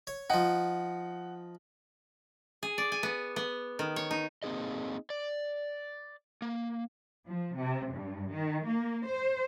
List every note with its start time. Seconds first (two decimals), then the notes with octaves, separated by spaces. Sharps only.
0.07 C#5
0.30 F3 D#4 F#5
2.63 G#4
2.78 D5
2.92 G#5
3.03 B3
3.36 B3
3.79 D#3
3.96 C#5
4.11 D#4
4.43 A#3 C4 D#4 G#4 D#5
5.10 D5
6.42 A#3
7.26 F3
7.57 C3
7.93 G2
8.32 D#3
8.66 A#3
9.04 C5